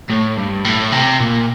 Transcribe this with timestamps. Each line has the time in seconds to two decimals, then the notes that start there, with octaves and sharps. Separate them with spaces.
0.10 A2
0.37 G2
0.65 A2
0.92 C3
1.20 A#2